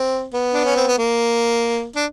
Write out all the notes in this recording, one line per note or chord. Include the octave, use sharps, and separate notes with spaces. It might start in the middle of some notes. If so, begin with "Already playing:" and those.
Already playing: C4
B3
D4
C#4
C4
B3
A#3
D4